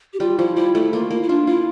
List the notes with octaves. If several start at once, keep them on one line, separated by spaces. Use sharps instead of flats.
G4
G3 F4
F3 E4
G3 E4
A3 E4
A#3 F4
A#3 E4
E4
D4 F4
E4 F4